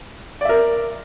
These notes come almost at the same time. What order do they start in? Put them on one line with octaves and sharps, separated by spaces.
D5 E5 A#4